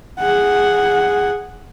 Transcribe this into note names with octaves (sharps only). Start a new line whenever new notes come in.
G#4 F#5